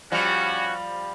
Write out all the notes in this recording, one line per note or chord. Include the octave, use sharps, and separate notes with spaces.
F3 G3 C#4 F#4